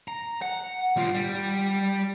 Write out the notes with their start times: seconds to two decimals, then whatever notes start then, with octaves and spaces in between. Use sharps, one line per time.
0.08 A#5
0.42 F#5
0.97 G3 F4
1.14 G3